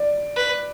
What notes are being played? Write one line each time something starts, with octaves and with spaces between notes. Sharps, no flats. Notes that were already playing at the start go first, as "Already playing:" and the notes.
Already playing: D5
B4